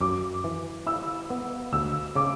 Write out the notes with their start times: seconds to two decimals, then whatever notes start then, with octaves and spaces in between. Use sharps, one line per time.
0.01 F#2 D6
0.44 E3
0.87 E4 E6
1.30 B3
1.73 D2 E6
2.15 C#3 D6